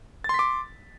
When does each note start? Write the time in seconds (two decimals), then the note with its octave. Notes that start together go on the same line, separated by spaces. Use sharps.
0.24 A6
0.29 C6
0.34 B6
0.39 D6